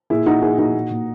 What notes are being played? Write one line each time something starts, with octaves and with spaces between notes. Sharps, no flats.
A#2 E4 G#4
A#2 D#4 F#4
A#2 E4 G#4
A#2 D#4 F#4
A#2
A#2